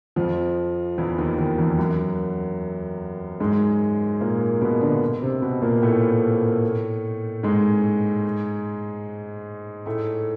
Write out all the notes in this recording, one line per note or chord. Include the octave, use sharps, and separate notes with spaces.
F2 F3
E2 E3
D#2 D#3
D#2 D#3
E2 E3
F#2 F#3
G#2 G#3
A#2 A#3
B2 B3
D3 D4
C3 C4
B2 B3
A#2 A#3
A2 A3
G#2 G#3
A2 A3